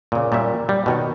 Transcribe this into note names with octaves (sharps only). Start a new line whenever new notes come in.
A#2 C#3
A#2 G3 C#4 E5
G3
B2 D#3 C#5